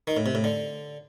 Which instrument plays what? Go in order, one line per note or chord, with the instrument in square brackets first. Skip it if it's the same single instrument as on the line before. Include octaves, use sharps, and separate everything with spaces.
[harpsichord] D#3
A2
C3
A2
D3